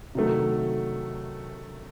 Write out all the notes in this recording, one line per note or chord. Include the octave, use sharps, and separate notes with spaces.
C3 D#3 F#3 A3